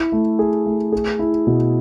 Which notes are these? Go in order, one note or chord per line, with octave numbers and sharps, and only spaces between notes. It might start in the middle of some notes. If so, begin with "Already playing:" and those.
Already playing: E4
A3
G#4
A3
G#4
E4
B2